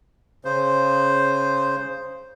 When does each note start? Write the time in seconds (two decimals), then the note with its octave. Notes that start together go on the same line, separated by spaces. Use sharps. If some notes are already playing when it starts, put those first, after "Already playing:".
0.45 C#3 C5